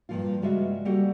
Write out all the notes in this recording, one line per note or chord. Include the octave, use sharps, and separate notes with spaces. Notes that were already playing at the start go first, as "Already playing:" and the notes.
G2 A#2 D3 F3 A#3 F4
C#3 G3 G#3 F4 F#4 E5
G3 A#3 F#4 G4 A4 F#5